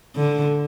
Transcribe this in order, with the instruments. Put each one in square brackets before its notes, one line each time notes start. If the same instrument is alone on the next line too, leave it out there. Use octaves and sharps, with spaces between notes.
[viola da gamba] D3